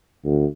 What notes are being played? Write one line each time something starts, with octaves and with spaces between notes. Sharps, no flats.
D2